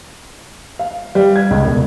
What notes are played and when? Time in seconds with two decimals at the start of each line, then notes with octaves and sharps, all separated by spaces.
0.79 F5
1.15 G3
1.36 G#6
1.51 C#2
1.65 E1